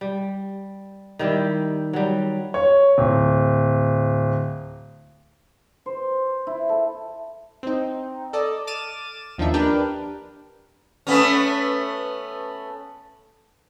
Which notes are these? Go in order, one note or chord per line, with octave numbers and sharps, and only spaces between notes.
G3
D#3 G3 E4 G4
F#3 G3
C#5
D1
C5
E4
A4
C4 D#4
A4 D5 D#5
D6 F6 A6 D#7 E7
D#2 F3 A#3 D4 D#4 E5
D4 G4 A#4 B4 G5
A3 B3 C#4